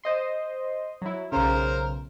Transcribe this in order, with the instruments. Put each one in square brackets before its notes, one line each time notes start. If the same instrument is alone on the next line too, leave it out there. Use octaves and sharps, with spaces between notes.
[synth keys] C5 D#5 C6
F#3 E4
[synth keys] B1 C#3 [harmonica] A#4 C5 A#5